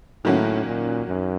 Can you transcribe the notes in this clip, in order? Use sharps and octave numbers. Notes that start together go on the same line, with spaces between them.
A2 D#3 F#3 A#3 C#4 F#4
A#2
F#2